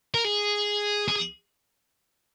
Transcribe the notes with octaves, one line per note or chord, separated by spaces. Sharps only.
A#4
G#4
G#4